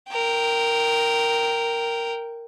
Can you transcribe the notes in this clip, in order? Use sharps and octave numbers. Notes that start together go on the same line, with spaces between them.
A#4 G5